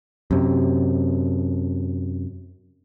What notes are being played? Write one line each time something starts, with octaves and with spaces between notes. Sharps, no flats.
F#2 C3